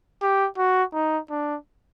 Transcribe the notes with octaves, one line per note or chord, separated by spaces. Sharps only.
G4
F#4
D#4
D4